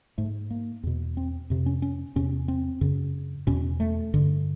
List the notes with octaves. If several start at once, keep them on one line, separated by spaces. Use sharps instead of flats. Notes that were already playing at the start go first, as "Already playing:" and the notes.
G#2 A3
A#3
E2 B2
C4
F2 C3
C#4
C#4
E2 C3 C#4
C4
F#2 C#3
E2 B2 C#4
A3
G2 D3